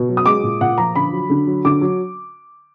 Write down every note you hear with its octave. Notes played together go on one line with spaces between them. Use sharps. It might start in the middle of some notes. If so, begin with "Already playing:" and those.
Already playing: B2
F#3
D#6
G#3 D6
A#2
A#2 F#5
F3 A#5
D3 B5
F#3
D3
F#3
D3 D6
F#3